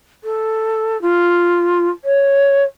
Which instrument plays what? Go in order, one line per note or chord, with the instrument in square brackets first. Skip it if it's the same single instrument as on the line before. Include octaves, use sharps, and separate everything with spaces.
[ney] A4
F4
C#5